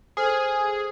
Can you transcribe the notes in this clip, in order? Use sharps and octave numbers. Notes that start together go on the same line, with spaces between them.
G#4 A4 C5 F6